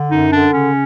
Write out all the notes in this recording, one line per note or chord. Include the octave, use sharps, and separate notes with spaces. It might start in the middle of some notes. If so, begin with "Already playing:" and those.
Already playing: D3
F#2 D#4
D3 D4
C#3 C#4